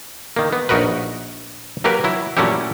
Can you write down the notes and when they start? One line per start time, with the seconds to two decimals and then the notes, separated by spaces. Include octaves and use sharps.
0.36 D#3 A#3
0.53 B3
0.69 A#1 D#4 F#4 A#4 B4
1.84 F#3 A#3 G4 A#4 B4
2.04 F#3 E4
2.37 A#2 F#3 A3 C#4 E4 G4